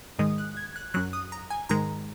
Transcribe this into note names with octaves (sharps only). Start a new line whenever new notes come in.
G#2 D#3 G#3 D#6
F#6
G#6
F#6
F#2 F#3 F#6
D#6
A#5
G#5
G#2 D#3 G#3 A#5